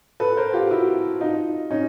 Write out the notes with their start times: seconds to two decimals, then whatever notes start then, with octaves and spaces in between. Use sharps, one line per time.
0.20 A4 B4
0.37 A#4 C5
0.53 F4 G4
0.70 E4 F#4
1.20 D#4 F4
1.70 C#4 D#4